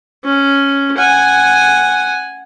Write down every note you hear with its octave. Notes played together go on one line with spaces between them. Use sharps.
C#4
F#5 G#5